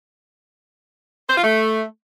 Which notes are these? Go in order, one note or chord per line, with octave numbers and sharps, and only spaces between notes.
C5
F4
A3